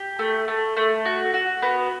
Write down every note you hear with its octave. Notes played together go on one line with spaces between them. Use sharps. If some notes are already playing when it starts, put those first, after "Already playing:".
Already playing: G4
A3
A3
A3
F#4
F#4
B3